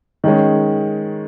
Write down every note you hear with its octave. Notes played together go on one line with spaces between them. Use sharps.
D#3 G#3 C#4